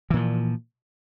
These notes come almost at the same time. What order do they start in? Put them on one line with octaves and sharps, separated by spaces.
E3 A#2 F3